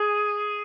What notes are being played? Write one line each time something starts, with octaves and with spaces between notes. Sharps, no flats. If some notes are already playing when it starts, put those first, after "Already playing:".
Already playing: G#4